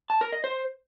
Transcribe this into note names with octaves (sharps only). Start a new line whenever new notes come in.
A5
A#4
D#5
C5